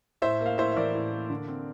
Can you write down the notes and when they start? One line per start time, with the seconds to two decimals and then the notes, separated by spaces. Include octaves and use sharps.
0.22 A2 C5 E5
0.40 A#3
0.46 F5
0.58 A2 C5 E5
0.72 E5
0.76 E3 A#4 D5
0.95 A2
1.13 A#3
1.30 D3
1.48 C4